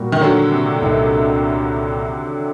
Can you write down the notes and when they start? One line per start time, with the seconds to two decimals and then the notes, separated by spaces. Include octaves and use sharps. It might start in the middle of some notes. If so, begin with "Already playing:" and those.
Already playing: A#2 G3 A#3 F#4
0.12 D#3
0.21 D3 F#3
0.52 C3
0.81 C2 A#2 A3 D#4